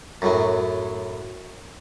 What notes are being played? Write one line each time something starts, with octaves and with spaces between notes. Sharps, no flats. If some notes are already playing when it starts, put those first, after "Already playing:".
F#2 A2 F#3